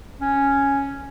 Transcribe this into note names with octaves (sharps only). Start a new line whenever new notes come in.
C#4